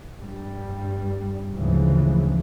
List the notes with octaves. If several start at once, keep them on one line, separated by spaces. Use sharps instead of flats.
G2 G3
D2 G#2 C#3 E3 F3